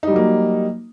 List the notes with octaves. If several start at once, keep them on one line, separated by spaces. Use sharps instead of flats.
F#3 G3 A#3 D#4